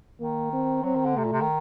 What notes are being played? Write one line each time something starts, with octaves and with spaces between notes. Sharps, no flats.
D#3 A#3
C4
F#3 C4
D#3
D3
C3 A3
A#2
C3
D#3